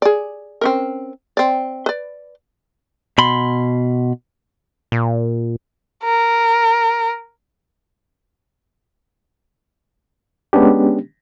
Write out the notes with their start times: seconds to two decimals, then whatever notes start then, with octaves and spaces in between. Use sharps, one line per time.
0.02 G#4 D5
0.61 C4 C#4 A#4
1.37 C4 D5
1.86 B4 D5
3.18 B2 B5 C6
4.92 A#2
6.04 A#4
10.53 G#3 B3 C#4 D4 G4